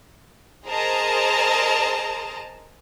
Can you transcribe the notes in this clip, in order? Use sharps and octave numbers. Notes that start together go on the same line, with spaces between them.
G#4 A#4 C5 D#5 A5 A#5